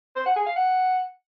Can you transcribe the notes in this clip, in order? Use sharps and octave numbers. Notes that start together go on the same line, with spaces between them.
C5
F#5
G#4
F5
F#5